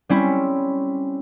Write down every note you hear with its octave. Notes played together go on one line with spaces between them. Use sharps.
G3 C4 C#4 E4